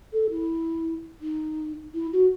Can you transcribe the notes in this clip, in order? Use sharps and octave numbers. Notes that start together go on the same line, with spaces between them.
A4
E4
D#4
E4
F#4